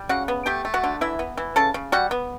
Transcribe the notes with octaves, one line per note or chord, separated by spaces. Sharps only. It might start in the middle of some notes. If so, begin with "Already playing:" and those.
Already playing: G3
C#3 F#4 F#5
B3
A3 G4 G5
A3
F#4 F#5
D3
E3 E4 E5
B3
E3
C#3 A4 A5
C#3
G3 F#4 F#5
B3